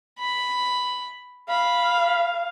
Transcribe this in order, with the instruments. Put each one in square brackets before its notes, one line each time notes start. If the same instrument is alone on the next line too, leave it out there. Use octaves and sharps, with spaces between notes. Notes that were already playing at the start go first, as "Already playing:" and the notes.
[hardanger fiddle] B5
[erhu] F5 [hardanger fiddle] B5